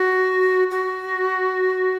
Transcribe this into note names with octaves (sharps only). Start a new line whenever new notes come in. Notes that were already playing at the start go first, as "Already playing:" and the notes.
Already playing: F#4
F#4